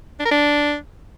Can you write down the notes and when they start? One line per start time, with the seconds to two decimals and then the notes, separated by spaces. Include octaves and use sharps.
0.20 D4
0.26 A#4
0.31 D4